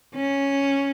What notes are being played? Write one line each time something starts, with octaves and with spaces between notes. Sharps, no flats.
C#4